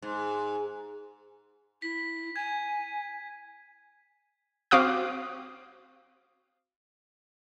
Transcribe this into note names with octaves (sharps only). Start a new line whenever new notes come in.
G#2
E4 B6
G#5 G#6
C4 F#4 F5 D6 D#6 F#6